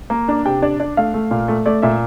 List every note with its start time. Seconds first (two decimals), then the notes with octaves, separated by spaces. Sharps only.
0.10 A#3
0.28 D4
0.45 C3 G5
0.62 D4 D5
0.80 D4 D5
0.97 A3 F5
1.14 A3
1.31 A#2
1.48 A3
1.66 A3 D5
1.82 A#2 E5